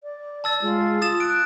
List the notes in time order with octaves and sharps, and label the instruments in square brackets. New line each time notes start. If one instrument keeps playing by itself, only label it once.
[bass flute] D5
[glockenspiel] A5 E6 A6
[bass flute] G#3 [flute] F4
[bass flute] F4 [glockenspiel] D#6 A6 E7
[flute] F#6 [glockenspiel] D7